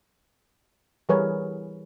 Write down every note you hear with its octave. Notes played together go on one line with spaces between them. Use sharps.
E3 G3 G#4 A#4 B4 C#5